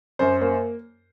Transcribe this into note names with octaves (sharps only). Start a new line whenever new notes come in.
F#2 C5
A#3 C5